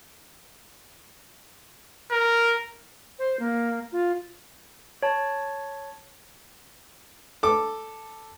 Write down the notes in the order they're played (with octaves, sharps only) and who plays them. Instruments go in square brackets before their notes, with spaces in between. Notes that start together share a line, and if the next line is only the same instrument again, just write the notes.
[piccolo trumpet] A#4
[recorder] C5
A#3
F4
[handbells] C#5 A5
[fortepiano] A4 D6